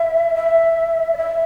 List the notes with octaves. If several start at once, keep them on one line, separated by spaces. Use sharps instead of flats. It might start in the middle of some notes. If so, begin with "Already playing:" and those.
Already playing: E5
E5
D5
E5